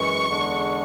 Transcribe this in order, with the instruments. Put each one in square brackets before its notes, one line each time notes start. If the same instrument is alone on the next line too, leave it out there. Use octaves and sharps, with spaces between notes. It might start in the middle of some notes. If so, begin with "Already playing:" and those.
Already playing: [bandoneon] F#2 E3 G#3 [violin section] C#6
[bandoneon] E2 D3 G#3 D4